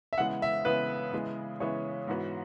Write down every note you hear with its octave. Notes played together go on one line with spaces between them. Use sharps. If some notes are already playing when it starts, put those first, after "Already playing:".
E5
C#3 E3 G#3 B3 E4 F#5
E5
C#3 E3 G#3 B3 E4 B4
C#3 E3 G#3 B3 E4
C#3 E3 G#3 B3 E4 C#5
G#2 E3 B3 F#4